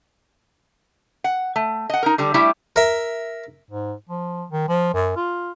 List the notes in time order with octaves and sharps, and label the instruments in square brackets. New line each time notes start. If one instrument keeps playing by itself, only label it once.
[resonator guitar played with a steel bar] F#5
A3
D#5 F#5
D#4 A#4
D3 G3
G3 A3 E4 G4
[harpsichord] A#4 E5
[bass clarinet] G#2
F3
D#3
F3
F#2
F4